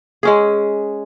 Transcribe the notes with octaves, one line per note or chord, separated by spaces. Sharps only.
G#3 C#4 G#4